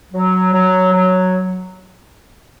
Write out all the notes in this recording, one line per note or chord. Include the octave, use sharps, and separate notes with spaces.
F#3
F#3
F#3